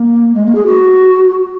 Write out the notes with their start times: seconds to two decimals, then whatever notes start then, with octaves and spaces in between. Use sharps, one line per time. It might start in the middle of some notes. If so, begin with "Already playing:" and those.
Already playing: A#3
0.35 G#3
0.46 A#3
0.55 G#4
0.66 F#4